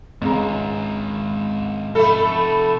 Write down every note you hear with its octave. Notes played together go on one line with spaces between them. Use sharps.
C#2 G#2 D#3 G#3 A#5
C3 F3 A3 A4 B5